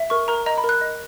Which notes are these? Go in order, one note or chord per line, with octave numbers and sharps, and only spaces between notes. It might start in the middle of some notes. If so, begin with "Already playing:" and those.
Already playing: E5
A#4 C#6
A#4 A#5
D#5 A#5
B5
A#4
F#6
D#5